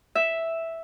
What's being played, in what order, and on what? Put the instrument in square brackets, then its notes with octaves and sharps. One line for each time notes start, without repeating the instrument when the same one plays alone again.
[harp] E5